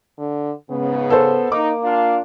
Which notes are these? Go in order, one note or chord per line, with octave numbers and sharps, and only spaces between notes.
D3
G#2 C#3 B3
A4 C5
A#3 D#4 D6
D4 F4 F5